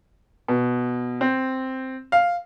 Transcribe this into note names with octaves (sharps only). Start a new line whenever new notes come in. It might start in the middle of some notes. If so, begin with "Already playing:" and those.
B2
C4
F5